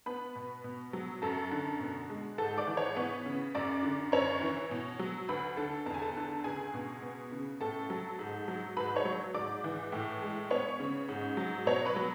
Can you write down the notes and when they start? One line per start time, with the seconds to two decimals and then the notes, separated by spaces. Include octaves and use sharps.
0.06 B3 B4 B5
0.35 B2
0.64 B2
0.93 F#3
1.22 F#2 A4 A5
1.51 D3
1.80 B2
2.10 G#3
2.38 G#2 A4 A5
2.58 D5 D6
2.67 E3
2.77 C#5 C#6
2.96 B3
3.26 C#3
3.55 F#2 D5 D6
3.83 D3
4.12 F#2 C#5 C#6
4.41 E3
4.71 B2
4.99 F#3
5.29 D2 B4 B5
5.57 D3 A4 A5
5.86 E2 A5
5.94 G#5
6.02 A4 A5
6.16 D3
6.44 C#2 G#4 G#5
6.74 B2
7.02 B3
7.32 C#3
7.61 A2 A4 A5
7.90 F#3
8.19 G#2
8.48 F#3
8.77 G#2 B4 B5
8.96 C#5 C#6
9.05 F#3
9.34 G#2 D5 D6
9.64 E3
9.92 A2
10.22 G#3
10.51 B3 C#5 C#6
10.80 C#3
11.09 G#2
11.37 F#3
11.66 B2 C#5 C#6
11.85 B4 B5
11.96 F#3